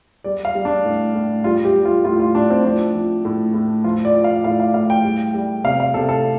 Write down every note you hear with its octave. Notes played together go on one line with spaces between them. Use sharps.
G3 D5
F5
G3
D4
A2
A2
G3 F4
G4
G3
F4
A2 F4
F4
A2 D4
C4
F3 D4
F3
A2
A2
F3 F4
D5
F3
F5
A2 F5
F5
A2 F5
G5
G3
G3
C3 F5
F5
C3 A4
A4